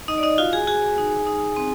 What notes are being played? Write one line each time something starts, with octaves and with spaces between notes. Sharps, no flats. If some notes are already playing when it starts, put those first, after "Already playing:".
D#4 D#5
D5
D#4 D#5
F4 F#4 F5
G#4 G#5
F#4 G#4 G#5
D#4
D#4
C4